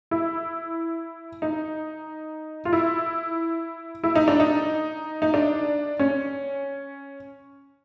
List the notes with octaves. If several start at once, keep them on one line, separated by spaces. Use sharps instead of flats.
E4
D#4
F4
E4
E4
D#4
D4
D#4
D#4
D4
C#4